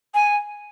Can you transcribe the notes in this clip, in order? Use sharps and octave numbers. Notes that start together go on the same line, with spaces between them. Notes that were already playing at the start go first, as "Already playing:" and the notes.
G#5